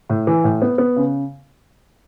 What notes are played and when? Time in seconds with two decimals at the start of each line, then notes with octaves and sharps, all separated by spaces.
0.09 A2
0.27 E3
0.44 A2
0.62 B3
0.78 B3
0.96 C#3